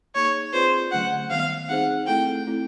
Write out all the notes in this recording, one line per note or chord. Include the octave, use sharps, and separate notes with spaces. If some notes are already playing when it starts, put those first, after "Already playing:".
A#3 D#4 G#4 C#5
C4 F4 G#4 B4 C5 D5
D3 F#3 A3 C#4 F#5
D#3 G3 B3 F5
C4 D#4 G#4 C5 F#5
A3 C4 E4 A4 G5
A3 C4 E4 A4